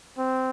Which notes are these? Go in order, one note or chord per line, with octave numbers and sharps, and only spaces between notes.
C4